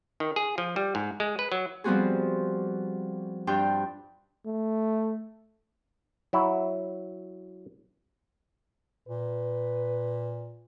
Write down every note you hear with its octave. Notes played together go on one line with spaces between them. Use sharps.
D#3
G#4
F3
G3
G#2
G#3
B4
F#3
F3 G3 B3 C4 F#4 G#4
G2 D4 F4 G5
A3
F#3 E4
A#2 B4